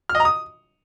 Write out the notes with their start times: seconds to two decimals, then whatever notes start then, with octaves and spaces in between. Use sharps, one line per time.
0.09 F6
0.15 D#5
0.20 A#5
0.25 D#6